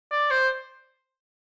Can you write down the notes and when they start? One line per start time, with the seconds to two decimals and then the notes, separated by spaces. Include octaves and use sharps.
0.12 D5
0.31 C5